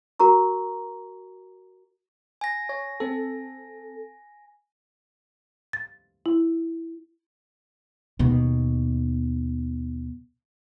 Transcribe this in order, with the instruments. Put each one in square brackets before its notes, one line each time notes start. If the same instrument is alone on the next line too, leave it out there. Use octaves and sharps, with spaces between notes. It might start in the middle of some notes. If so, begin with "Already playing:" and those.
[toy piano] F#4 A#4 A#5 C#6
[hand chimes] G#5 A#6
[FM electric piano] C#5
C4 A4
[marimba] A6
E4
[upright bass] D#2 B2